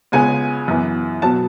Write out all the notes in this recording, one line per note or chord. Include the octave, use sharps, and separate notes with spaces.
C#2 C#3 G#3 B3 G#5
F#2 E3 B3
B2 F#3 B3 A5